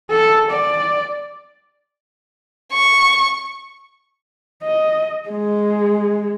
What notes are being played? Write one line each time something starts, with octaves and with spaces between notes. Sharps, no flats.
A4
D5
C#6
D#5
G#3